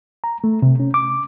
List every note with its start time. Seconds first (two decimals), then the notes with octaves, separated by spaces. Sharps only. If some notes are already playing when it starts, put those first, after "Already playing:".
0.24 A#5
0.44 A3
0.62 C3
0.80 C#4
0.94 D6